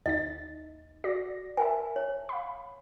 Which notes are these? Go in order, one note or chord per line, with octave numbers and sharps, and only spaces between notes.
D#2 D#4 D#5 A6
F#4 D5 A#6
A#4 E5 G#5 A5
C#5
F5 B5